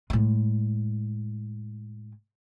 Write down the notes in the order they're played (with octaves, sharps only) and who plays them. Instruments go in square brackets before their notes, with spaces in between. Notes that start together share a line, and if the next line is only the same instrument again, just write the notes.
[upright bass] A2 G#3